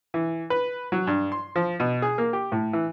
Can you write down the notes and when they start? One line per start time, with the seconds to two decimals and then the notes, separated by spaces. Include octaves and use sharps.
0.14 E3
0.50 B4
0.92 F#3
1.07 G2
1.32 C6
1.56 F3
1.80 B2
2.02 G#4
2.18 A#3
2.33 G4
2.52 A2
2.73 E3